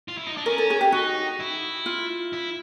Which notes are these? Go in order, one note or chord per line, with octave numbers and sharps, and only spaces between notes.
F4
E4
D#4
D4
C#4 A#4
A4
G#4
G4
D#4 F#4
E4
F4
E4